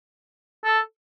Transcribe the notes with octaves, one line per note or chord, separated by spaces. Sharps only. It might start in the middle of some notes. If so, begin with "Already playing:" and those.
A4